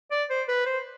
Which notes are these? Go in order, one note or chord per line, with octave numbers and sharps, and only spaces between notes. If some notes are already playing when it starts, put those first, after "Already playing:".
D5
C5
B4
C5